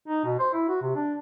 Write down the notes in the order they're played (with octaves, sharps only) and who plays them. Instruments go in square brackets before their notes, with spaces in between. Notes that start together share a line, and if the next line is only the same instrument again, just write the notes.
[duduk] D#4
B2
C5
E4
F#4
C3
D4